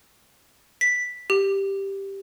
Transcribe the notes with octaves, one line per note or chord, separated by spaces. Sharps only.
B6
G4